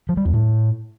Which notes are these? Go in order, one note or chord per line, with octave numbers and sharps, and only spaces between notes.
F3
G3
E2
A2